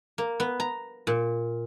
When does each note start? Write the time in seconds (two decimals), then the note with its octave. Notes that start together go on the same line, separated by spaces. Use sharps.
0.18 A#3
0.40 B3
0.60 A#5
1.07 A#2